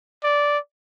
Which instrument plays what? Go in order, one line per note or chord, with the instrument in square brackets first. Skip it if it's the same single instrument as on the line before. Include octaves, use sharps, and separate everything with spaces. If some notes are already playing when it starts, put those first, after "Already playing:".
[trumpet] D5